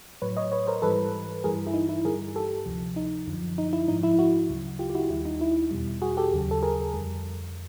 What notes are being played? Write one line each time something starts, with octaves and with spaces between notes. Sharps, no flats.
A2 F#3 B4 C#5
C#5 D#5
B4 C#5
A#4 C5
G#2 E3 G3 A4 B4
G2 E3 G3 G#4 A#4
E4
D#4
E4
G2 D3 G3 G#4 A#4
G4 A4
D2 C3 F3
D#4
F#2 D3 F3
D#4
E4
G#2 F3 D#4
E4
E4 F#4
D2 C#3 F#3
F4 G4
G4
E4 F#4
D#2 D#3 G3 E4
D#4
E4
E2 B2 G3
F#4 G#4
G4 A4
D#2 C#3 F#3
A4
G#4 A#4
F2 D3 G3